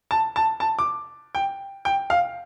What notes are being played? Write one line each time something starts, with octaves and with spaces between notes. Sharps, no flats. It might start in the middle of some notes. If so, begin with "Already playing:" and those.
A5
A5
A5
D6
G5
G5
F5